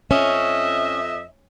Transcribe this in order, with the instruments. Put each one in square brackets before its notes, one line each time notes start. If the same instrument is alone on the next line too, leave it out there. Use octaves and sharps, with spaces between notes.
[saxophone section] F2 D#5 E5 [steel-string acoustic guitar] C#4